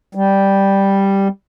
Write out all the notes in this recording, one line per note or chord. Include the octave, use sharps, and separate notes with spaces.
G3